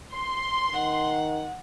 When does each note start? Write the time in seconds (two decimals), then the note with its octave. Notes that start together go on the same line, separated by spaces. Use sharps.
0.14 C6
0.73 D#3 F#5